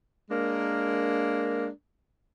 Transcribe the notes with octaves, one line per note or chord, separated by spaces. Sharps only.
G#3 A#3 D4 A#4